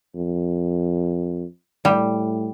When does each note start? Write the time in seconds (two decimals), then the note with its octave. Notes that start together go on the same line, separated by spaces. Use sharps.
0.15 F2
1.85 A2 G3